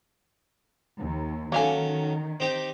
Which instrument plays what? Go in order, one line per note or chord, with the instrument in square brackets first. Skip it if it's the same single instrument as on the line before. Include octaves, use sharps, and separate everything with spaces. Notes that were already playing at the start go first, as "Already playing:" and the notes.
[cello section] D#2
[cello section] D#3 [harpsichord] F#3 C#4 A4 [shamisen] A#3 F5 G#5
[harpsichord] C4 D#4 G4